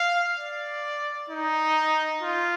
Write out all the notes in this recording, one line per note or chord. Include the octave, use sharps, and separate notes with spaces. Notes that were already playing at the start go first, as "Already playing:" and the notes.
Already playing: F5
D5
D#4
F4